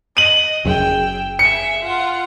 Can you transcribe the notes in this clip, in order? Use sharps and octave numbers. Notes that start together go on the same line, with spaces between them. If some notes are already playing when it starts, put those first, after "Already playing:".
D#5 D#7 F#7
F#1 F#2 G#4 G5 E6
G#4 E5 C#7
F4 F#5